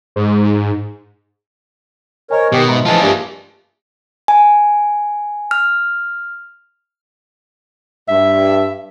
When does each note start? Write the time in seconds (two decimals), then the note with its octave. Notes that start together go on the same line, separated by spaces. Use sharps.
0.16 G#2
2.31 A#4 C5 C#5 D#5 G#5
2.52 B2 D#3 G4
2.68 G#2 G#3 E5 A#5 C6
2.86 E3 F3 F4 G#4 D#5 A5
3.01 G2 A#3 D4 G4 D5 E5
4.28 G#5
5.51 F6
8.08 G2 E5